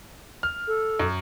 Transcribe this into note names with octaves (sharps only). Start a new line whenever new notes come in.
F6
A4
F#2